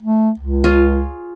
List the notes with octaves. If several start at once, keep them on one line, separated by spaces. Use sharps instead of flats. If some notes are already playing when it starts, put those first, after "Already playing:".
A3
C#2
F4 G#4 C#5